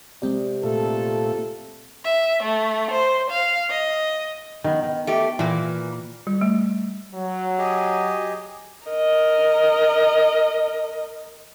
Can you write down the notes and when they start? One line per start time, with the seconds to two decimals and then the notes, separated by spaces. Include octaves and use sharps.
0.22 C3 G#3 C4 D5
0.63 A#2 A3 A4
2.05 E5
2.43 A3
2.91 C5
3.30 F5
3.70 D#5
4.64 D#3 B3
4.83 D#3
5.07 A3 G4
5.39 A#2 E3 A#3
6.27 G3
6.41 A3
7.14 F#3
7.58 G4 G#4 D#5
8.88 A#4 D#5